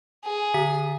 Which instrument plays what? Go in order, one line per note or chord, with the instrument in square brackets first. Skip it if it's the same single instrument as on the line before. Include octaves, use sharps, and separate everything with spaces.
[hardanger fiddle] G#4
[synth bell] D3 B6